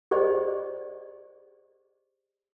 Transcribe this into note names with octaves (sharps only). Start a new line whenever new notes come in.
G4 G#4 C5 D5 D#5